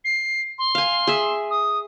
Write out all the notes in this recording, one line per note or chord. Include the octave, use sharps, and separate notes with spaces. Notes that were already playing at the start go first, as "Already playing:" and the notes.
C7
C6
F5 G#5
G#4 E5
D#6